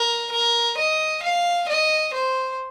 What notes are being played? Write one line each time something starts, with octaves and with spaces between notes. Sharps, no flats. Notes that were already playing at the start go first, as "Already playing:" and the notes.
Already playing: A#4
A#4
D#5
F5
D#5
C5